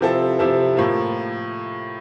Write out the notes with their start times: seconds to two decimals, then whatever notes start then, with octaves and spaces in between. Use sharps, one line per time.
0.01 C3 F3 C4 E4 A4
0.39 C3 F3 C4 E4 A4
0.76 A2 F3 A#3 F4